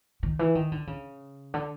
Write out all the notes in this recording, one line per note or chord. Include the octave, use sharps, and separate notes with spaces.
D#3
E3
D#3
D3
C#3
D3